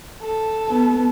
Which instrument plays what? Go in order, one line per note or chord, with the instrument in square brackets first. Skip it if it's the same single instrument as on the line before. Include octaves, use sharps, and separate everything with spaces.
[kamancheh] A4
[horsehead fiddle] B3